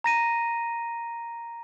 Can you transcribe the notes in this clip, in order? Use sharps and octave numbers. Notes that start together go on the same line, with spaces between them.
A#5 A#6 D#7